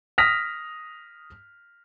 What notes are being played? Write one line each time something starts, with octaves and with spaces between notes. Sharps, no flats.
D#6 F6 A#6 B6 F7